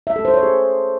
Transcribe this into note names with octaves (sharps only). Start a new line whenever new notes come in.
E5
A4
C5
C#5
G#4